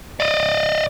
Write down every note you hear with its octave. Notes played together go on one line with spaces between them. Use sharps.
D5 D#5